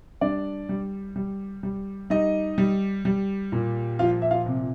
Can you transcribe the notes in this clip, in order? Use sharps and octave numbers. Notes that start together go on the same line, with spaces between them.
G3 D4 D5
G3
G3
G3
G3 D#4 D#5
G3
G3
A#2
F3 F4 F5
E5
F4 F5
C3